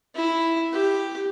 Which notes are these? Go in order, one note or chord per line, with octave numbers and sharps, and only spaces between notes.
E4
G4